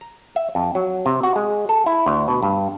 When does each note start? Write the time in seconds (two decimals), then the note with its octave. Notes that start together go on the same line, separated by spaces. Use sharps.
0.01 A#5
0.36 E5
0.55 F2
0.75 F#3
1.06 C3
1.23 F#4
1.36 G#3
1.69 A4
1.86 E4
2.06 D2
2.28 B2
2.43 G2